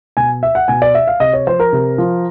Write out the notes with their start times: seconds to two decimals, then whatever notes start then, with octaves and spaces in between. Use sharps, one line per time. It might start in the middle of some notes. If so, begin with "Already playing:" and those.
0.17 B2 G#5
0.43 E5
0.55 F#5
0.68 B2 G#5
0.82 D5
0.95 E5
1.07 F5
1.20 C3 D#5
1.33 C#5
1.47 F3 C5
1.60 A#4
1.73 C3
1.98 F3